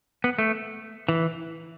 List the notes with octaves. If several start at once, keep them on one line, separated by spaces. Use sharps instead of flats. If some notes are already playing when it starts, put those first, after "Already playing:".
B3
A3
E3